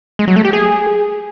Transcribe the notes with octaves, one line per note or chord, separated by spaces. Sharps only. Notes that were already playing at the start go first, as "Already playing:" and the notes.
G#3
F#3
A3
G4
G#4